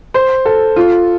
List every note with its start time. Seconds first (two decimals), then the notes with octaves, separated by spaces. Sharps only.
0.14 C5
0.45 A4
0.76 F4